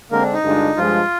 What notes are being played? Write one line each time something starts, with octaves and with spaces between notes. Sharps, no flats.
D3 G#3 A#3 C4 A#4
D4
D#4
G2 D3 G#3 D4 F4
G2 F3 G#3 F4